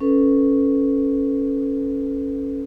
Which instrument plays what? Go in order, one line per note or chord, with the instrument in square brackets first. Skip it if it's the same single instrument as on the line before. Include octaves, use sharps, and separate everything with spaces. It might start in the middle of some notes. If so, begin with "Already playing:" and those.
[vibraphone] C#4 A4 B4